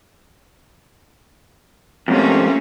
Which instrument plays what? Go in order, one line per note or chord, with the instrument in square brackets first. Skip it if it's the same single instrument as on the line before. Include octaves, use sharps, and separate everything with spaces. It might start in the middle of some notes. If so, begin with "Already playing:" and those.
[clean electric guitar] F2 G#2 C3 [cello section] A3 A#3 C#4